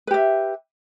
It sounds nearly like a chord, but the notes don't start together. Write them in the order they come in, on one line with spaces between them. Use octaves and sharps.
B4 G4 E5